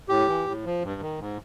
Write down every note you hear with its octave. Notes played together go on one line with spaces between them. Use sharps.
A2 G4
E3
A2
F3
G2
D#3
G#2